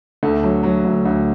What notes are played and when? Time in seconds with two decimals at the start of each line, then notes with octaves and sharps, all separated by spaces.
0.23 D2 A3
0.44 F#3
0.63 F#3
0.85 D2
1.06 D2